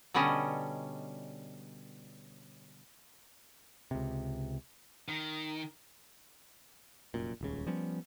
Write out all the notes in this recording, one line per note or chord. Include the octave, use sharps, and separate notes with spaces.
B2 D3 G3 C#4 D#5
C#2 C3
D#3
F1 F#2 A#2
D#1 C#2 C#3
F3 G3 B3 C#4